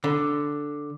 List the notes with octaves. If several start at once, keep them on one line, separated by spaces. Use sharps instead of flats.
D3